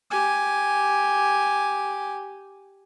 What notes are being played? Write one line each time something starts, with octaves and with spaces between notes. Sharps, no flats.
G4 G#5